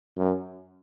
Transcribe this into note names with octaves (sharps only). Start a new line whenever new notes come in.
F#2